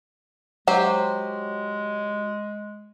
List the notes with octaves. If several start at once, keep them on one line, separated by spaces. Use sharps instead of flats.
F#3 G#3 G4 C5